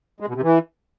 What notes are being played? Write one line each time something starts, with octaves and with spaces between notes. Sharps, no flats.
G#3
B2
C3
E3